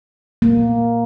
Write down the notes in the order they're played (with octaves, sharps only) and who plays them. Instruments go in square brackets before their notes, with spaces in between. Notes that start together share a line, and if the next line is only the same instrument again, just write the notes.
[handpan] A#3